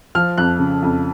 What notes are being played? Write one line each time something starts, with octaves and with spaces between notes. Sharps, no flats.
F3 F6
F2 F#6
C#3
F2